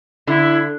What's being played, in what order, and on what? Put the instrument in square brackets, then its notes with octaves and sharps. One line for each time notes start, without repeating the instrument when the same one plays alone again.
[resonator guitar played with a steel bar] D3 [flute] E4